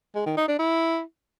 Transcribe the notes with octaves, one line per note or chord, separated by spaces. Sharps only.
G#3
D#3
D#4
D4
E4